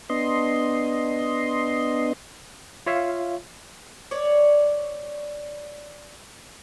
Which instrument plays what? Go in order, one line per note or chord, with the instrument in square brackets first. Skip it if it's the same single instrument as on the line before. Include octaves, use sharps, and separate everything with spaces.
[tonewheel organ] B3 D4 D#5 C6
[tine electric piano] F4 C#5 E5 F5
[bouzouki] C#5 D5